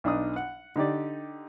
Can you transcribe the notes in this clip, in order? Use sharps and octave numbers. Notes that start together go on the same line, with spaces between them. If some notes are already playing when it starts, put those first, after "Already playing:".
B1 D4 D#4 D#6
F#5
D3 D#4 G4 D5